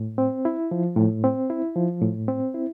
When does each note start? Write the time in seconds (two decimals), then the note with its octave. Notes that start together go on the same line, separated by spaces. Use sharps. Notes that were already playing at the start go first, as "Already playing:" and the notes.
Already playing: A2
0.18 C4
0.45 E4
0.71 F3
0.96 A2
1.24 C4
1.50 E4
1.76 F3
2.02 A2
2.28 C4
2.54 E4